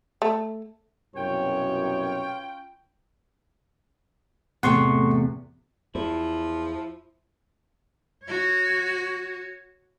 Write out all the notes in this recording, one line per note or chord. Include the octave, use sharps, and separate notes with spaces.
A3
C2 F#2 B2 C#4 F4 C#5 G5
E2 A2 C3 G4 F#5 C6 C#6
E2 F3 E4
F#4 C#5